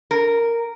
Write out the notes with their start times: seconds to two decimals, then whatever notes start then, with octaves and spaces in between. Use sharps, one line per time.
0.11 A#4